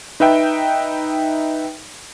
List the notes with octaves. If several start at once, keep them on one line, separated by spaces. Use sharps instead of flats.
D#4 B4 E5 G5